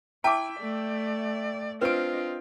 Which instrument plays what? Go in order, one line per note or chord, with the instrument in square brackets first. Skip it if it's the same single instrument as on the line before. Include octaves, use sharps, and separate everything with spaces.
[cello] E4 [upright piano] E5 G5 [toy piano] A5 D6
[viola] A3 [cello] D5
[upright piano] C4 D7 [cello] D4 D#5 [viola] F4 [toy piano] B4